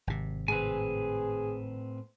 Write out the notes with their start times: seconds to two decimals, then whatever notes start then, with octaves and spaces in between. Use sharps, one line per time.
0.07 G#1 C3
0.48 A2 C4 G#4 B4 G#5